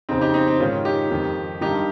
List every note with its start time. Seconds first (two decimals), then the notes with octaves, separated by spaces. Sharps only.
0.09 F2 C#3 C4 D#4
0.21 D#4 G4
0.34 C4 D#4
0.47 C4
0.60 G#2 D#3 C#4 F4
0.85 D#4 G4
1.11 F2 D#3
1.61 G2 D#3 D#4 G4